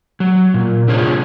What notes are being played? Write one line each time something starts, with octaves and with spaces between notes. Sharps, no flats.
F#3
A#2
C3 D4 F4 G#4 C#5